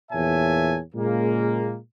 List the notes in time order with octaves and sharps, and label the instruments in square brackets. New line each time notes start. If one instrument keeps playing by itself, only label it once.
[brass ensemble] E2 A#2 C#5 E5 G#5 A5
A#2 C#3 G#3 A#3